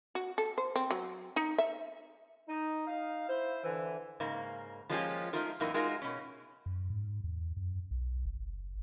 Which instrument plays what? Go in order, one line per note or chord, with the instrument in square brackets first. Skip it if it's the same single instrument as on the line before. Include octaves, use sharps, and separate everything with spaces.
[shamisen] F#4
A4
C5
C4
F#3
D#4
E5
[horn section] D#4
D#4 F5
E4 C5
D3 E3
[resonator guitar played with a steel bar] G#2 C#3 A#3
F3 G#3 A#3 C#4 F4 G4
G#3 A3 D#4 F4 A#4
F#2 A2 E3 A#3 D#4
G#3 D#4 F4 F#4 A#4
B2 C#4
[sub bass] F#2
G#2
E2
F#2
B1
F#1